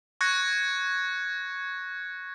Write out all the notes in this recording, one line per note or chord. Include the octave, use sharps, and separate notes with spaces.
C#6 F#6 G#6 A#6 C#7